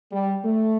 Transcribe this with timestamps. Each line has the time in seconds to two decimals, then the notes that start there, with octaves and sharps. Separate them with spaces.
0.12 G3
0.44 A3